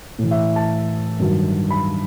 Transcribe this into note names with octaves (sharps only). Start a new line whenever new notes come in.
A2 E3
E5
A5
G2 D#3 F#3
B5